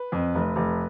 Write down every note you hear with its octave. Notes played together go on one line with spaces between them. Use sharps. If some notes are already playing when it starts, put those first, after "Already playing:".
Already playing: B4
F2
F1
F1